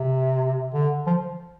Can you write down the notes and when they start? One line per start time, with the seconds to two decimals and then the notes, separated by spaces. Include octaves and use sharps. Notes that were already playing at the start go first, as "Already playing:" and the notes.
Already playing: C3
0.74 D3
1.07 F3